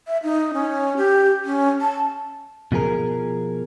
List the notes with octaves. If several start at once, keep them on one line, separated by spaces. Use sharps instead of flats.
E5
D#4
C#4
G4
C#4
A5
B2 F3 G#4 A#4